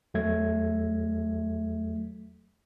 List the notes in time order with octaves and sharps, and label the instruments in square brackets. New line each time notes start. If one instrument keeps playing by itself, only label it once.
[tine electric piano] E2 F#3 A3 E5 G#6